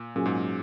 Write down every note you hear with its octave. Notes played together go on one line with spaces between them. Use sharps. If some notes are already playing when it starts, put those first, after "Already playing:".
Already playing: A#2
A#2 F#3 C#4 G#4
G#2